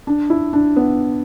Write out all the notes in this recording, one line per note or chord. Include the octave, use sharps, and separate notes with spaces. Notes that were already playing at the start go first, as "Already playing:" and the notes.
D4
E4
D4
B3